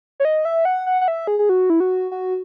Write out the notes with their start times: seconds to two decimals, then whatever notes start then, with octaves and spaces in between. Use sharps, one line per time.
0.20 C#5
0.25 D#5
0.45 E5
0.65 F#5
0.86 F#5
1.01 F#5
1.08 E5
1.27 G#4
1.39 G#4
1.49 F#4
1.70 E4
1.80 F#4
2.12 F#4